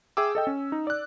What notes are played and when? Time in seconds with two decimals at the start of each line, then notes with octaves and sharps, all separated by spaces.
0.17 G#4 E5 G5 D6 E6
0.35 A4 D#5 G5
0.47 C#4
0.72 D#4
0.87 D5 F#6